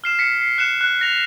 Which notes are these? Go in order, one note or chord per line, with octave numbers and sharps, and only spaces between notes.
F6 C7 E7
B6 C#7
C7
F#6 C#7 E7
F#6
A#6 F7